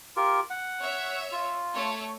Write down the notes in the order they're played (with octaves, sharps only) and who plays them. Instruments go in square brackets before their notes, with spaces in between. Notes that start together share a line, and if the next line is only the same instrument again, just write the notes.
[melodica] F4 G4 A#4
F#5
[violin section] C#5 E5
[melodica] F4
[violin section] A3 C#5